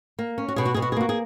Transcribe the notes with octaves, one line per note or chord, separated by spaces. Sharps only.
A#3
C#4
F#4
B2 G#4
F#4
B2 G#4
F#4
G#4
A#3 F#4
G#4